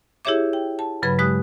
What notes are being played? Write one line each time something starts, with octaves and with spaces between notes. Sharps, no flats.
E4 G4 G#4 C#5 E5 D6
G5
A5
G2 C#3 F#3 B4 B5 G#6
G#3 G4 D#6 F#6